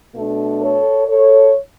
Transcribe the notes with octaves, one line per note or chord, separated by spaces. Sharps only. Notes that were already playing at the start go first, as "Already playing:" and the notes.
B2 A3 D4
A4 C#5
A4 C#5